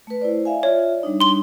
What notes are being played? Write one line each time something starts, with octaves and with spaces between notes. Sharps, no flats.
A3 B4
E4 C5 D5
E5 F5 G#5
F4 C#5 D5 E5
G3 D4 D#4
C6 G7